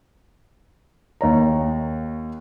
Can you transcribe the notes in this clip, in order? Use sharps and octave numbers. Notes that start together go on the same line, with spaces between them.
D#2 C#5 A#5